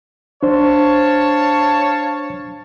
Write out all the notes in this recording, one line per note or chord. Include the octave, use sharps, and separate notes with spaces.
D4 C5 C#5 F5 A5